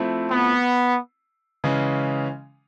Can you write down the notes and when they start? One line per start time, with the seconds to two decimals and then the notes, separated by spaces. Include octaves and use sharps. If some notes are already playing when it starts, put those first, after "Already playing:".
Already playing: F3 A3 C4 E4
0.31 B3
1.64 C#3 E3 G#3 C#4